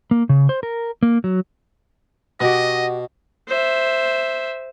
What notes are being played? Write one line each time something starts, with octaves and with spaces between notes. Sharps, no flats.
A#3
C#3
C5
A#4
A#3
F#3
B2 F#4 G4 D#5
C5 E5